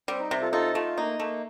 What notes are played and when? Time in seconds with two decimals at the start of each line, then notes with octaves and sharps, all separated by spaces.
0.08 G3 C4
0.19 D#4
0.31 C3
0.41 F4 A4
0.52 D#4 F4 A4
0.75 A3 F4
0.97 A#3 D#4
1.19 A3 A#3